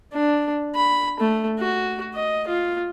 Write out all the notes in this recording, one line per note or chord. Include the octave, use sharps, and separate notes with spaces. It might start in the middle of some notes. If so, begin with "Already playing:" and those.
D4
B5
A3
F#4
D#5
F4